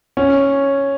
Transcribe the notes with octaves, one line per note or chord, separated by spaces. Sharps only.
C#4